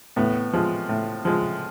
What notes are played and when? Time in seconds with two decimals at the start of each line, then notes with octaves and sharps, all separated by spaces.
0.16 A2 B3
0.53 F3 G#3
0.89 A2
1.25 F3 G#3